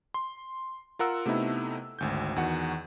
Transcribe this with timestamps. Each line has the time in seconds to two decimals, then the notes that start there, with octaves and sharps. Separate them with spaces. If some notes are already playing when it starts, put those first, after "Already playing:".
0.14 C6
0.99 F4 A#4 F#5 E6
1.26 C3 A3 B3 D#4 E4
1.99 G#1 D2 G6
2.36 E2 D#3 F#4 F#5